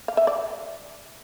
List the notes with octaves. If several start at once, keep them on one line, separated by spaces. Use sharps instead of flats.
F5
E5
D5